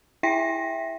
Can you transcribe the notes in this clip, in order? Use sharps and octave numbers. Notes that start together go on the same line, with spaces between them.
E4 E5 G5 A#6 B6